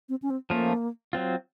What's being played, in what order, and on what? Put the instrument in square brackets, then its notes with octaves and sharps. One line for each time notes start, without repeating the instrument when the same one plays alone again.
[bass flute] C4
C#4
C4
[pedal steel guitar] F3 A3 C#4 F4 [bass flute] A#3
[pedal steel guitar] F#3 C4 F4